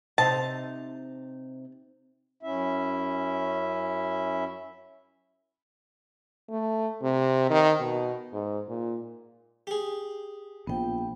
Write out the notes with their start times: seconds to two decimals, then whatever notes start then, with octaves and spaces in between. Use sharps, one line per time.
0.18 C3 D#4 C5 A5
2.43 F#2 C#4 E4 E5
6.50 A3
7.03 C3
7.50 D#3
7.80 B2
8.33 G#2
8.69 A#2
9.67 G4 G#4
10.67 A#1 D#3 F3 B3 G5